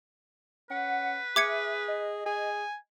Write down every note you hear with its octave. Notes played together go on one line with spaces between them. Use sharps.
C#4 B4 F#5
G#4 E5 D6 G#6 C#7
D#5
G#4 G#5